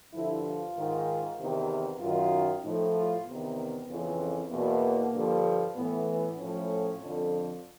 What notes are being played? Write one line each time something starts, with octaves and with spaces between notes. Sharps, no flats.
G2 D3 F3 E4
F4
G#2 D#3
E2 C3 D#3
F#2 D#3 F4
A2 F3 D#4
F4
E2 C3 D#3 B3
F2 C#3 E3
E2 B2 A#3
G2 D3 F3
A2 E3 B3
B3
A2 F3 C#4
F2 D3 F3